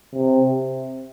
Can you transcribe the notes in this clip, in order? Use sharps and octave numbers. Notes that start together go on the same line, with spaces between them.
C3